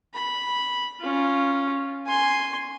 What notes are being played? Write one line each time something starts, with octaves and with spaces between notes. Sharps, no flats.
B5
C#4 F4
G#5 C6